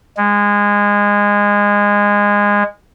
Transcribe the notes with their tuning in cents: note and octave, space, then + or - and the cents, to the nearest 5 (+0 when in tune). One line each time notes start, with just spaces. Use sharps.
G#3 -20